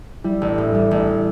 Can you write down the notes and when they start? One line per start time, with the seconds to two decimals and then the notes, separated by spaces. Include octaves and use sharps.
0.24 G3 E4
0.42 A1
0.58 A2
0.74 G3
0.91 A1